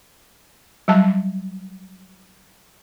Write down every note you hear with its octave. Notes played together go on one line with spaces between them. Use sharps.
F#3 G3 A5